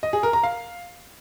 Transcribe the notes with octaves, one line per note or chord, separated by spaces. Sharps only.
D#5
G#4
A#4
A#5
F5